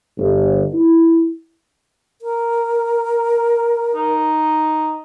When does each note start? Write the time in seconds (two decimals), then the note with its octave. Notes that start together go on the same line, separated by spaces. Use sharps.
0.18 G1
0.73 E4
2.21 A#4
3.95 D#4